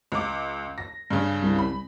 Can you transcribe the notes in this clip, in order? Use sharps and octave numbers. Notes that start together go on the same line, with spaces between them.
C#2 D6
A#6
G2 C#3
C2
B5